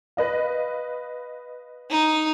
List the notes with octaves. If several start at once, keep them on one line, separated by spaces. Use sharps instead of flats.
B4 D#5 F5
D#4